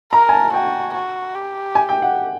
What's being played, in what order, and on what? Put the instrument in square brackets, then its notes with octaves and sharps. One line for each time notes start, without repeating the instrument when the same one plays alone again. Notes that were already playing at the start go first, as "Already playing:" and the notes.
[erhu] A#4 [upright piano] A#5
[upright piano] G#5
A5
[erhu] F#4 [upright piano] G5
[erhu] F#4
G4
[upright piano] G#5
G5
F#5